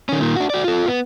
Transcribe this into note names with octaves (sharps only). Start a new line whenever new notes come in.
D#3 C#4
A#2 D#3
D4 F#4
F#4 D5
F4 A4
B3